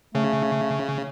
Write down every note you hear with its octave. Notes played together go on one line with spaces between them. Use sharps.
C#3 A3